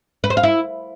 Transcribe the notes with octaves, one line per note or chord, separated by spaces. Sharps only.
B4
C5
F5
E4